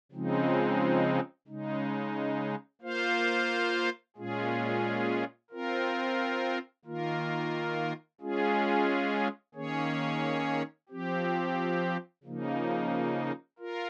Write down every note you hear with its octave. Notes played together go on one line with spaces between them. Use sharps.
C#3 F3 G#3 C4 D#4
C#3 G#3 D#4
A#3 F4 C5 F5
A#2 G#3 C#4 F4 G#4
C4 F4 A#4
D#3 A#3 F4 A#4
G#3 C#4 F4 G#4
D#3 A#3 C#4 G#4 C#5
F3 C4 G4
C#3 F3 A#3 D#4
F4 A#4